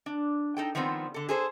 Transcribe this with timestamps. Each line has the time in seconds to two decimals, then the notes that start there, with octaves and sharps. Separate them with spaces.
0.06 D4
0.57 D#4 A4 G5
0.75 D#3 F3 G3 B3 C4
1.14 D3 A4
1.29 G#4 A4 C5